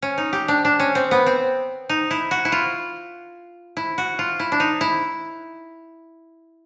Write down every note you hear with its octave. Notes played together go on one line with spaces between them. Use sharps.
C#4
D#4
G4
D4
D4
C#4
C4
B3
C4
D#4
E4
F#4
E4
F4
E4
F#4
F4
E4
D4
D#4
E4